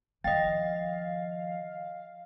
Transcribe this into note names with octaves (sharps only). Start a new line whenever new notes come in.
D#3 F3 D#5 F5 G5 A6